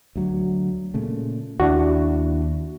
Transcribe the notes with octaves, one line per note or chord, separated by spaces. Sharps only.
D2 F#3
A#2 C#3 A3
D#2 D4 E4 F#4